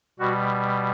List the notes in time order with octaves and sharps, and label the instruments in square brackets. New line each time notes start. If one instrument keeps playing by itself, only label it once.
[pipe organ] B2 G3 F#4